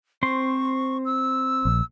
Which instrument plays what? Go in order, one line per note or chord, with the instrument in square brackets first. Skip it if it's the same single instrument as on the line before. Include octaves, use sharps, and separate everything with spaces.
[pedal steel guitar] C4 C5 C6 [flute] C#6
[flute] E6
[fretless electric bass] A#1